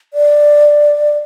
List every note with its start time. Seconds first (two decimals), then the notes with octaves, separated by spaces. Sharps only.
0.14 D5